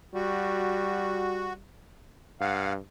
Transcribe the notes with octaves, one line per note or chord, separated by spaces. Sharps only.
G3 F#4
G2 F5 F#5